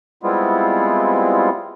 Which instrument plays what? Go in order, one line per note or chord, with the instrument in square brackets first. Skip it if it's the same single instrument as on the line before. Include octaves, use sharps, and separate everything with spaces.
[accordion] G3 G#3 B3 C4 E4 F4